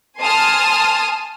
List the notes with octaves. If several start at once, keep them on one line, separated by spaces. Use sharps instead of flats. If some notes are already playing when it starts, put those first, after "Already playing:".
G#5 A5 C6 D#6 F6